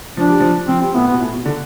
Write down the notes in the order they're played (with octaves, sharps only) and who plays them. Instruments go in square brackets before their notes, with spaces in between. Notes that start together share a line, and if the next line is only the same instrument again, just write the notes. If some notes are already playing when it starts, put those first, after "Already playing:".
[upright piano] F3 [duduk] D4
[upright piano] G3
F3
[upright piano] F3 [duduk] C4
[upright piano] G3 [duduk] C4
[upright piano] A2 [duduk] B3
[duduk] B3
[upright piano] B2
A2
B2
D3